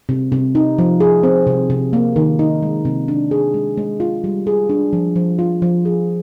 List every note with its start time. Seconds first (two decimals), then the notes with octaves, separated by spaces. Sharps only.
0.09 C3
0.32 C3
0.55 D#4
0.79 F3
1.00 G#4
1.23 C4
1.47 C3
1.70 C3
1.93 A#3
2.16 D#3
2.39 D#4
2.63 G#3
2.85 C3
3.08 D4
3.31 G#4
3.54 G#3
3.77 G#3
4.00 F4
4.24 G3
4.47 G#4
4.70 D4
4.93 F3
5.16 F3
5.39 F4
5.62 F3
5.85 G#4